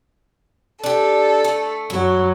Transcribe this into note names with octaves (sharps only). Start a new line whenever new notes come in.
D4 G4 A4
A3
F#2 F#3 E4